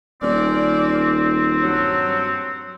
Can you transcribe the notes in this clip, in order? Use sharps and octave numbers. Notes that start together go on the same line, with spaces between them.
D#1 C4 C#4 A#4 D5
G2 F#3